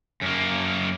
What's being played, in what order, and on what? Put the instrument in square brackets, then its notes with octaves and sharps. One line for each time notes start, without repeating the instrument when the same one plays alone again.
[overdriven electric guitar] F#2 A#3